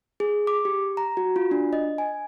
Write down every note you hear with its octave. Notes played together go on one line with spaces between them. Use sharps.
G#4
D6
G4
A#5
F#4
F4
D4
D#5
G#5